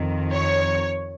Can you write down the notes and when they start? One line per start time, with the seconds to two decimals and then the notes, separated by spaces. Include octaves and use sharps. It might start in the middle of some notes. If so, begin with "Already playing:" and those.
Already playing: F2 D#3
0.30 C#5